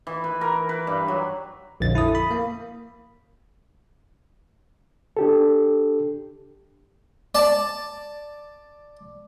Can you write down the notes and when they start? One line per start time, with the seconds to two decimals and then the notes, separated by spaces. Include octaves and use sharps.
0.07 E3
0.24 B4
0.41 A#4
0.69 B4
0.87 G2
1.08 F#3
1.80 A#1 F2 D3 A6
1.95 E4 A4 D#6
2.15 B5
2.31 A#3
5.17 D4 G4 A4
7.35 D5 A5